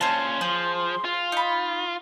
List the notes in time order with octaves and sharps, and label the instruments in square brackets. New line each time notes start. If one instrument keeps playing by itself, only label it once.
[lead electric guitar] A#2 C#4 [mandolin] C5 D#5 A5 [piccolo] C6
[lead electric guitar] F3 [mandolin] G#4
[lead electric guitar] F4
[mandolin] D#4 B5